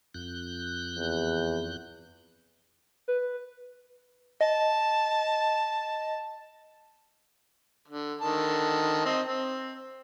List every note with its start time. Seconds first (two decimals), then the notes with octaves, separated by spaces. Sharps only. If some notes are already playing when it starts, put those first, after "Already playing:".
0.14 F2 F#6 G6
0.96 E2
3.08 B4
4.41 D#5 A5
7.88 D3
8.21 D3 D#3 A5
9.05 C4 D#5
9.26 C4